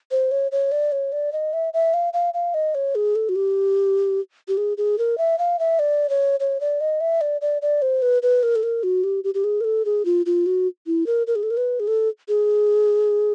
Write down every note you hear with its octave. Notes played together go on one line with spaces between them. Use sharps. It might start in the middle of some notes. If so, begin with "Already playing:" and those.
C5
C#5
C#5
D5
C#5
D5
D#5
E5
E5
F5
F5
F5
D#5
C#5
G#4
A4
F#4
G4
G4
G#4
G#4
A#4
E5
F5
E5
D5
C#5
C#5
D5
D#5
E5
D5
D5
D5
C5
B4
B4
A#4
A4
A#4
F#4
G4
G4
G4
G#4
A#4
A4
G#4
F4
F4
F#4
E4
A#4
A#4
G#4
A4
A#4
B4
G#4
A4
G#4